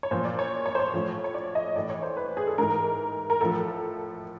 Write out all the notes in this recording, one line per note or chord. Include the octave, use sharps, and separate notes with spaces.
C#5
A#2 F3 C5
D5
C#5
C#5
C5
C#5
A2 F3
C#5
D5
D#5
A2 E3 D5
C#5
C5
B4
G#4
A4
G#2 E3 A#4
A#4
A2 F3 A4